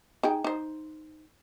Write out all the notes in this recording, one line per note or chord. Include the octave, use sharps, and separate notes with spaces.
D#4 G#4 G5
D#4 C5